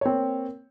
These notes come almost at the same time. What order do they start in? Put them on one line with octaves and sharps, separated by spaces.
C#5 C4 A#3